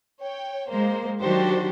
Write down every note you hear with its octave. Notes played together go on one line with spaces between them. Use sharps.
C#5 G5
G#3 A#3 C5
D#3 F#3 D4 F#4 G4 C5